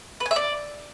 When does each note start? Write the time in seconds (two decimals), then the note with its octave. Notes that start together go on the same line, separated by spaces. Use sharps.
0.20 B4
0.26 G#5
0.31 E5
0.36 D5